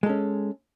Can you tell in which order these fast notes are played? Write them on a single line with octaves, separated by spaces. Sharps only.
G#3 A4 C#4